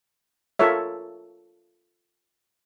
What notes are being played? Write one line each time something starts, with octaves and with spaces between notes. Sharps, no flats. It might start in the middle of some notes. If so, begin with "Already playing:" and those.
F4 A4 A#4 C#5 E5